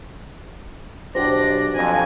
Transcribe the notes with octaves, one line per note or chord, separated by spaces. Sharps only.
B1 D4 F#4 G4 C5 A#6
F2 G#5